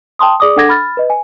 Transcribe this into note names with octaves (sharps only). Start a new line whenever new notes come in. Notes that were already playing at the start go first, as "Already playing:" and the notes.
G5 A5 C6 D#6
G#4 D5 D6 D#6
D4 A4 F#5 D6 G#6 A#6
B5 F6 A6
B4 D#5
G#5